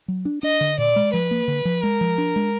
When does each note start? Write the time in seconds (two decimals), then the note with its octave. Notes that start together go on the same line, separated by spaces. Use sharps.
0.08 F#3
0.25 D4
0.43 D4 D#5
0.61 D3
0.78 A#2 D5
0.96 G#3
1.13 F3 B4
1.31 A#3
1.48 D3
1.65 F3
1.83 G#3 A#4
2.01 F3
2.18 D4
2.36 G#3